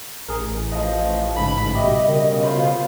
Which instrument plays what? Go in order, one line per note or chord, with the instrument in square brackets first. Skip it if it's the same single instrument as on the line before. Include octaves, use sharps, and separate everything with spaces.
[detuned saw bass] A1 [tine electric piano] G#4 A#4
[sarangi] F3 [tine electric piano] D#5
[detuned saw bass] A1 [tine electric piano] G#2 C#3 [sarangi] B5
[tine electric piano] B2 G3 G4 [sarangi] D#5 [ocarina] E5
[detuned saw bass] C#3 [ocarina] A#4
[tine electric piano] B2 C5 B5 [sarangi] F4